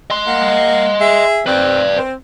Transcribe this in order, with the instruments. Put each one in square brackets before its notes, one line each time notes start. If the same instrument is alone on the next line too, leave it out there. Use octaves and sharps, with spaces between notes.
[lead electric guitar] D#5 C6
[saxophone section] A#3 F#5
G#4 E5
[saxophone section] C4 [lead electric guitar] B4 D5
[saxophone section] C4